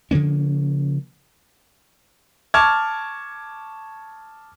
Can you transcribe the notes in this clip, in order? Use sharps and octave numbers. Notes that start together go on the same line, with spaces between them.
C#3 F3 A#3 C#4
A5 C#6 D6 F6 G#6